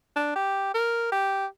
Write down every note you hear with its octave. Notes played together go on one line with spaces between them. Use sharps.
D4
G4
A#4
G4